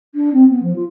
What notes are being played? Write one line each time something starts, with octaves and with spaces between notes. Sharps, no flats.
D4
C4
B3
F3
F4